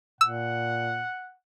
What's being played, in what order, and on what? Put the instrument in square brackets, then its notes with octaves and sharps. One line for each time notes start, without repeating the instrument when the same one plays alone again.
[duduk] A#2 [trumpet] F#5 [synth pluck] E6